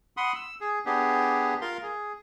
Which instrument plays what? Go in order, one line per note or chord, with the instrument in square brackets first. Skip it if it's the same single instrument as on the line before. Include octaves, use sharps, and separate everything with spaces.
[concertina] F#5 B5 C6 D#6
E6
G#4
B3 D4 G4 G#4
F4 A#4 F5 C6
G#4